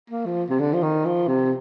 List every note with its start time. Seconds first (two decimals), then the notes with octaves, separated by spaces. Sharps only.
0.10 A#3
0.26 F3
0.50 C3
0.60 D3
0.74 F3
0.83 D#3
1.06 F3
1.28 C3